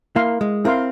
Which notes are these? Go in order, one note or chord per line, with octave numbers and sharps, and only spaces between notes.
A#3 E4 A#4 F5 C6
G#3
C4 E4 A#4 F5 C6